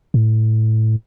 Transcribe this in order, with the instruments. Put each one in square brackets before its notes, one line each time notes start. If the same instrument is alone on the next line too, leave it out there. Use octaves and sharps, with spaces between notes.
[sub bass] A2